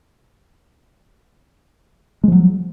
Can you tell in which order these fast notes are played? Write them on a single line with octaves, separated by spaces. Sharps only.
G#3 F3 F#3